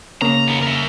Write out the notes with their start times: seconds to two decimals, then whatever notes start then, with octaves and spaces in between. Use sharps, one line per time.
0.22 C#3 A#3 A#5
0.48 D#2 B3
0.62 A#4 E5